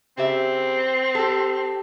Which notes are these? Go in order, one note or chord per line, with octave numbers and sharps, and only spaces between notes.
C#3 C4 G4 E5
G4 A4